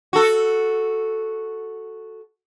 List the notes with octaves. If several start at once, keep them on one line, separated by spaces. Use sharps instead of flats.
F#4 A4